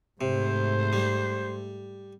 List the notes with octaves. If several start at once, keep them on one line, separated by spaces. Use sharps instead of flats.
G#2 C3 A3 C5
G3